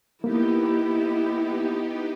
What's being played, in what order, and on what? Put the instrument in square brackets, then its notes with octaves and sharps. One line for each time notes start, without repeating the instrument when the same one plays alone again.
[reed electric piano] A#3 [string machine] B3 D#4 G4 [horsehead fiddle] E4